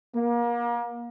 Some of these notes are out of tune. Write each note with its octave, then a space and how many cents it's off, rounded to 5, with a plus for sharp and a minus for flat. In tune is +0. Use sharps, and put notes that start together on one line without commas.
A#3 +30